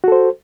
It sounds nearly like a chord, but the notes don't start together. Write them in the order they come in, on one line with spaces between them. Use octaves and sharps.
F#4 A4 C5